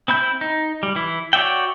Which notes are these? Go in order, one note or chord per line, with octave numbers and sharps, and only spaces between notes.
C4 E4 B5 G6
D#4
G3
E3 E4
F#4 C#5 D5 E5 G5